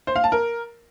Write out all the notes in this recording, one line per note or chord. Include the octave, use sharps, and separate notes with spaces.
C5
F5
A5
A#4